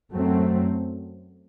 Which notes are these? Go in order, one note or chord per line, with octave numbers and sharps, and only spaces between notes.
F#2 F#3 A3 C4